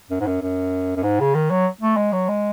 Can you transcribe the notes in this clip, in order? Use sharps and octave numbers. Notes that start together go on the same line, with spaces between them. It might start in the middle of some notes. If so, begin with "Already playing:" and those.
F#2
G#2
F#2
F#2
F#2
G#2
C#3
D#3
F#3
A3
G#3
F#3
G#3